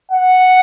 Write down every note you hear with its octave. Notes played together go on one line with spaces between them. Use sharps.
F#5